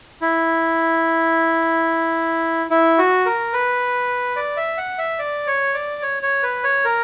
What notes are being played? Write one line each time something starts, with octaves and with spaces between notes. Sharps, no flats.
E4
E4
F#4
A#4
B4
D5
E5
F#5
E5
D5
C#5
D5
C#5
C#5
B4
C#5
A#4